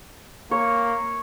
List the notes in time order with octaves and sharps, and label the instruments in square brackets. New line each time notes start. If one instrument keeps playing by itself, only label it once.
[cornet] A#3 [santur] C#5